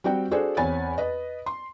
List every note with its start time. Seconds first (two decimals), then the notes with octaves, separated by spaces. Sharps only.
0.04 G3 C4 F#4 G5
0.31 D4 F#4 G#4 A4 C5
0.57 E2 C4 C#5 G#5 B5 A6
0.98 B4 D#5
1.46 C6